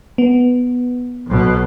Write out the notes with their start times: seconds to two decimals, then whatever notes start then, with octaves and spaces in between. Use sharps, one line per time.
0.18 B3
1.27 B1 B2